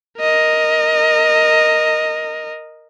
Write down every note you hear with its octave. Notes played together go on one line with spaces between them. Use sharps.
A#4 D#5